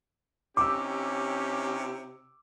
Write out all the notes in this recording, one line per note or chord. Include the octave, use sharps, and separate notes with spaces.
C3 C#4 D#4 E4 G4 D6 E6